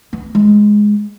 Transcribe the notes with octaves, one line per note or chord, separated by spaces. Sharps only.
B3
G#3